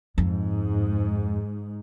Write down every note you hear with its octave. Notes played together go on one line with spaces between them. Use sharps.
F2 G#2